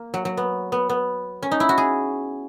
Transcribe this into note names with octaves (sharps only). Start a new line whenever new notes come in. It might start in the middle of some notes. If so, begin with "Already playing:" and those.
Already playing: A#3
F#3
F#3
B3
B3
B3
C#4
D#4
E4
F#4
G#4